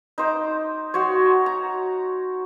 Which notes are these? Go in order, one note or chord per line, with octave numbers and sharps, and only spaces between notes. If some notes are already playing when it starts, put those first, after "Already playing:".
D#4 C5 D6
F#4 C5 C#5
A#5